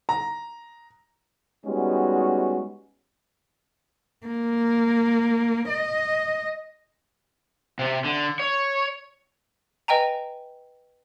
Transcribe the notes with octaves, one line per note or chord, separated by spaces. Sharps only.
A#5
G3 G#3 B3 C#4 D#4 F#4
A#3
D#5
C3
D3
C#5
B4 D#5 G5 G#5 A#5